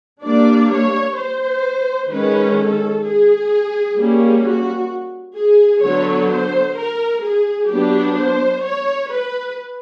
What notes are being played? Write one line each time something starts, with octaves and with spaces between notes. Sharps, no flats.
G3 A#3 D4 D5
C#5
C5
D#3 G#3 C#4 B4
A4
G#4
G3 A#3 C#4
F#4
G#4
D3 F#3 B3 C#5
C5
A#4
G#4
F#3 B3 D4 G4
C5
C#5
B4